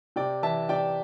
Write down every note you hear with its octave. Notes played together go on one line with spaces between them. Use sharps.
C3 D5 G5
E3 E5 A5
C3 D5 G5